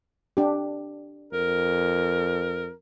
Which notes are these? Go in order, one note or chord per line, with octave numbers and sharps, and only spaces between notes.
D4 G4
F2 A#4